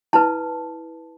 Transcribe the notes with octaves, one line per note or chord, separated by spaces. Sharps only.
E4 B4 A5